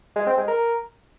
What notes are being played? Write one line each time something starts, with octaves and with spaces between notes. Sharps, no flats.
G#3
C4
G#3
A#4